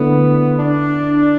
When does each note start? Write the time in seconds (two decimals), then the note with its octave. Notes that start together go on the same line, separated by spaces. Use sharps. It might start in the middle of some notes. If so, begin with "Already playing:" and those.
Already playing: D3 A3 B3 E4
0.59 D4